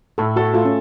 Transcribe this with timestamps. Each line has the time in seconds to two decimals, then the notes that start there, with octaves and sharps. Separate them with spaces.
0.18 A2 A4
0.36 F#4 A4
0.53 A3 F4
0.65 C#4